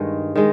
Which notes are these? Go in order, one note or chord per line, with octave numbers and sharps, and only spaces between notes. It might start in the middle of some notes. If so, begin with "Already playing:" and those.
Already playing: G2 D#3 G#3
D#3 G#3